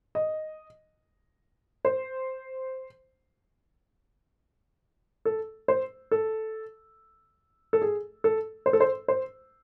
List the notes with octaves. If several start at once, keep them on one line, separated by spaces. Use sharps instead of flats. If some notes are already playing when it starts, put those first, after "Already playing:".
D#5
C5
A4
C5
A4
A4
G#4
A4
C5
A4
C5
C5